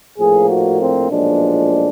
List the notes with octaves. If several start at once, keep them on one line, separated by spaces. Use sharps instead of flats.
A#1 A2 F3 A#3 G#4
F#4
C4
B1 A#2 F3 G#3 D4